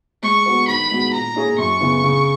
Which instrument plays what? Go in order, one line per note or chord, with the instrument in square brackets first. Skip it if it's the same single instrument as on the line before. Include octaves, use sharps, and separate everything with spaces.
[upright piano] G#3 [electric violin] C#6
[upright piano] B3 F#4 B4
[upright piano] D#3 [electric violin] B5
[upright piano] G#3 B3 F#4
[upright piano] A#2 [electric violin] A#5
[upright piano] A#3 E4 G#4 C#5
[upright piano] F#2 [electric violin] C#6
[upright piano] C#3 E3 B3
C#3